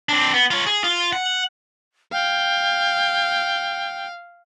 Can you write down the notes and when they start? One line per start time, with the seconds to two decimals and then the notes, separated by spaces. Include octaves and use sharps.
0.09 C4 D4
0.34 B3
0.51 F4 C#5
0.66 G#4
0.84 F4
1.13 F#5
2.12 F5 G5